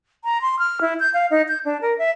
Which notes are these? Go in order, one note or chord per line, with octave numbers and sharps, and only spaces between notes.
A#5
C6
F6
E4
G6
F5
D#4
G6
D4
A#4
E5